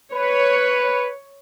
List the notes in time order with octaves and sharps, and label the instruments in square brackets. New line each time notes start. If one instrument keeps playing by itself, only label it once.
[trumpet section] B4 [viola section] C#5